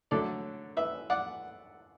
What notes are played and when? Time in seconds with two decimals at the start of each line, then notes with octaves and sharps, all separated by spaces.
0.11 D3 F#3 A3 A4 D5
0.77 B4 E5
1.10 D5 F#5